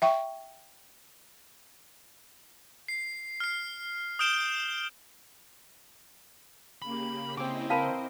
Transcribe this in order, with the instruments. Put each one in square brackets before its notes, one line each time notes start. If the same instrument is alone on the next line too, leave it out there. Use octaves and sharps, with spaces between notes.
[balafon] E5 G5 C#6
[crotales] C7
F6 C7
D#6 F6 G6 D7 E7 G7
[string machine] C#3 A#3 G4 [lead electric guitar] B5
[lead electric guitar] C#3 [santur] C4 D6 [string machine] E4 C5 D#5
[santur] C4 A#4 B4 [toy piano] F5 A5 B5